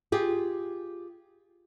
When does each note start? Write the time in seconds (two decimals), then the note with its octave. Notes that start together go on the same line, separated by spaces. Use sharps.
0.12 F4 G4 G#4